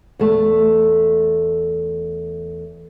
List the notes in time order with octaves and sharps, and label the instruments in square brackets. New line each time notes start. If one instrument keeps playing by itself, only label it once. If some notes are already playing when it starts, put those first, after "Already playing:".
[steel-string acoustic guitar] E2 A3